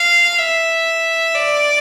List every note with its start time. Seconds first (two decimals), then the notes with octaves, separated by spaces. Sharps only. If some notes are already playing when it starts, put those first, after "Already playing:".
Already playing: F5
0.38 E5
1.35 D5